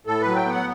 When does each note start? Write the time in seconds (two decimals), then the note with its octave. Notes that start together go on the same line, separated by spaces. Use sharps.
0.06 A2 A4
0.21 B4
0.27 F#3
0.36 G5
0.46 B3 F#5